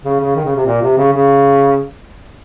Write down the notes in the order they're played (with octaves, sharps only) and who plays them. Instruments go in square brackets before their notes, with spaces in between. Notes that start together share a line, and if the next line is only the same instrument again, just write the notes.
[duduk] C#3
C#3
D#3
C#3
C3
A#2
C3
C#3
C#3